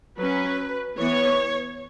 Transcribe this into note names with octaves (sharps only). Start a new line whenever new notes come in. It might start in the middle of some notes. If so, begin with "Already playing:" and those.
F#3 C#4 B4
E3 B3 C#5